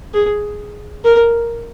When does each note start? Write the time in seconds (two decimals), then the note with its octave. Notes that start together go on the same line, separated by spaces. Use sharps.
0.14 G#4
1.04 A#4